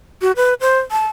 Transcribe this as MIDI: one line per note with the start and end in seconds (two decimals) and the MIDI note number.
0.22 0.32 66
0.36 0.54 71
0.61 0.80 72
0.92 1.08 81